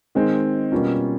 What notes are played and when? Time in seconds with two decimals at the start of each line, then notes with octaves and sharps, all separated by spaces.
0.15 D#3 G#3 C4
0.72 B2 G3 A#3 C#4 F4